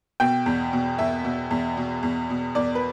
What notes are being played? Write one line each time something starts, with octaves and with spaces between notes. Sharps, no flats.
B2 G5
E2
B2
E2 E5
B2
E2
B2
E2
B2
E2 D5
B4